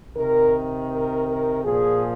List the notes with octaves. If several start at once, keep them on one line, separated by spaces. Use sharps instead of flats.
C3 D#3 A#4
A#4
A#4
A#2 F3 G#4